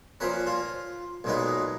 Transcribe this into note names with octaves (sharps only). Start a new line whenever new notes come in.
A#2 F3 A#3 C#4 B4
F4
B1 A#2 G#3 B3 D#4